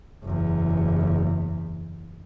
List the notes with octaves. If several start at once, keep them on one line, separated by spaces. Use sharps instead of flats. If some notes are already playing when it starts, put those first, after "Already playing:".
F#1 E2